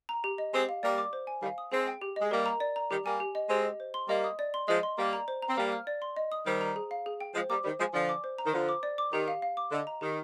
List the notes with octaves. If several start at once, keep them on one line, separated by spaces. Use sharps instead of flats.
A#5
G4
D#5
G#3 C4 G4
F5
G3 A#3 D5
D6
C5
G#5
D#3 G3 F5
D#6
G#3 C4 G#4
G5
G4
D#5
G#3
G3 A#3 A#4
A#5
D5
A#5
D#3 G3 G4
G3 A#3 G#5
G4
D#5
G#3 C4 G4
D#5
C5
C6
G3 A#3 D#5
D#6
D5
C6
F3 G#3 D#5
C6
G3 A#3 D5
A#5
C5
A#5
C4
G3 A#3 F5
F6
D5
C6
D#5
D#6
D#3 G3 C5
A#5
G#4
F5
G#4
G5
F3 G#3 C5
G3 A#3 D6
D#3 G3 C5
F3 G#3 G#5
D3 F3 D5
D6
C5
A#5
D#3
D3 F3 C5
D6
D5
D6
D#3 G4
F5
F5
D6
D3 D#5
A#5
D#3 G4